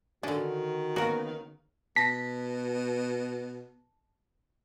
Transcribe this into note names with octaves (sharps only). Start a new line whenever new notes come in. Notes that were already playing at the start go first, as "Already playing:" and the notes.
D3 D#3 C#4 D4 F#4
C#3 F#3 A#3 B3 F#4 A#4
B2 A5 A#6 B6